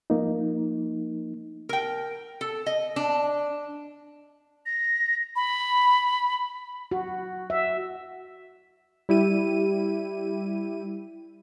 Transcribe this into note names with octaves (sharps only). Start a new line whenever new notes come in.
F3 A#3 D#4
A#4 G5
A4
D#5
D4
A#6
B5
F#4
E5
G3 E4 G4 D#7